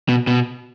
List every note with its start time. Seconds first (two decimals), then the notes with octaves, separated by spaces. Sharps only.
0.09 B2
0.27 B2